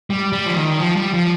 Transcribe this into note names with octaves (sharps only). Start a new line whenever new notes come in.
G3
G3
F3
D#3
F3
G3
F3